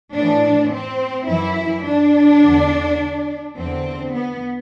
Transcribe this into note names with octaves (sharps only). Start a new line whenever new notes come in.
A2 E3 D4
C4
F#2 E3 E4
D4
E2 D3
E2 D3 C4
B3